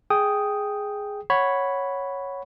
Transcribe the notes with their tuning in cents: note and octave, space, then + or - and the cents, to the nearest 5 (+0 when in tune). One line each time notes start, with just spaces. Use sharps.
G#4 +0 G5 +0 D#6 +0
C#5 +0 F#5 +0 B5 +0